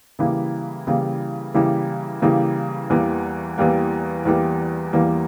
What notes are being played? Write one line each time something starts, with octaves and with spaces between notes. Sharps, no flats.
C#3 E3 G3 A#3 E4
C#3 E3 G3 A#3 E4
C#3 E3 G3 A#3 E4
C#3 E3 G3 A#3 E4
E2 E3 G3 A#3
E2 E3 G3 A#3
E2 E3 G3 A#3
E2 E3 G3 A#3